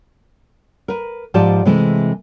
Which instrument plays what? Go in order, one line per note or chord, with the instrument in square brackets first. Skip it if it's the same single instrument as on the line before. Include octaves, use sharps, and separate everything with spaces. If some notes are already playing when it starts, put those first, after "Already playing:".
[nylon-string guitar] A#4 B4
G#2 F3 F4 G4 D5 A5
C3 E3 G#3 A3 C4